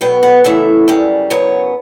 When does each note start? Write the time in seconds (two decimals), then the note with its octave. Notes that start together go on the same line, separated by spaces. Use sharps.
0.01 B2 F#3 B3 G5
0.23 F#5
0.44 F#2 C#3 E3 A3 E5
0.88 F#2 C#3 G3
1.30 F#2 C#3 F#3 B3 C#5